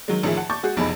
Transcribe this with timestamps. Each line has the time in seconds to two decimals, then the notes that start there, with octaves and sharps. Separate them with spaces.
0.08 D#3 F#3 G#3
0.23 A1 D#3 F3 G#4 E5
0.37 F#5 A5
0.50 A5 C#6 D6 G6 A6
0.63 G#3 F#4 G#4
0.77 F1 B1 E2 D#4 G#4 B5